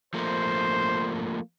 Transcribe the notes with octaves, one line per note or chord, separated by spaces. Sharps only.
F3 A3 A#3 C5